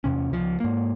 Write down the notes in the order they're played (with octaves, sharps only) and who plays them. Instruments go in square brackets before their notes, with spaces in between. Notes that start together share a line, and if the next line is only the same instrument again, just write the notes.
[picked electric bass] E2 C3 C#4
C#2 F3
G#2 A#3